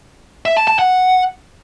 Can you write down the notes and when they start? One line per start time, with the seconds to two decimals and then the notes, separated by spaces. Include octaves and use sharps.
0.45 E5
0.57 A5
0.68 A5
0.79 F#5